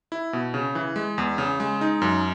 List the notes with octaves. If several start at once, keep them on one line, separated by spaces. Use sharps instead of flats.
E4
B2
C#3
E3
G#3
E2
C#3
G#3
D#4
F#2